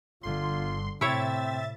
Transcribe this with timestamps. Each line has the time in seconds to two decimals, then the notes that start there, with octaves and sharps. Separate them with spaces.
0.23 G1 D3 F4 C6
1.01 A2 C3 C4 E4 C#5 E5 A6